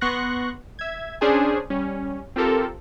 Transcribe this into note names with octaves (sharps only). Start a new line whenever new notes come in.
B3 C6 C#6 F#6 A#6
E5 G#6
C#4 D4 G#4 C5 G#5
G3 C#4
C4 F4 G4 A4 A#4